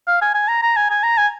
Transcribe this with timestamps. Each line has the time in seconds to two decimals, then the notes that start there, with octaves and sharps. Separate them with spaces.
0.07 F5
0.21 G#5
0.34 G#5
0.48 A#5
0.62 A#5
0.77 G#5
0.90 G#5
1.04 A#5
1.17 G#5